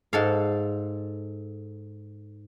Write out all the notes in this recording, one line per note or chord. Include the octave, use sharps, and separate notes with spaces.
G#2 A4 F5